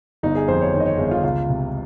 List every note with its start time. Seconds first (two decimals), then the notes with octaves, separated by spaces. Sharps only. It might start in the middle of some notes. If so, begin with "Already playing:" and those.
0.23 G1 D#4
0.35 G#4
0.48 F2 C5
0.61 C#5
0.73 D#3 C#5
0.80 D#5
0.86 C#5
0.98 G1 G#4
1.11 F4
1.24 C#2 F4
1.49 C3